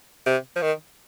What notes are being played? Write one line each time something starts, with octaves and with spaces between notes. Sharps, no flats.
C3
F3
D#3